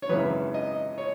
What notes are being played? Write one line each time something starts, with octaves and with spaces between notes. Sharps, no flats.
C#5
G#1 F#2 C#3 E3 B4
D#5
C#5